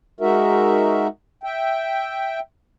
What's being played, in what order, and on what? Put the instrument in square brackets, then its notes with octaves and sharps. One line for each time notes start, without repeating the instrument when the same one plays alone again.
[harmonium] G#3 D#4 F#4 A#4 E5
E5 G5